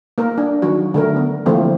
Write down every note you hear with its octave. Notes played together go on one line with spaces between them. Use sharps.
A#3 A#4
D4
D#3 F#3 F#4
D3 A3 A#4
B3
D3 E3 F3 A3 A#3 C4